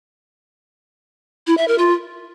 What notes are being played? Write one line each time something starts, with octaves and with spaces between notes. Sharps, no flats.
E4
E5
A#4
F4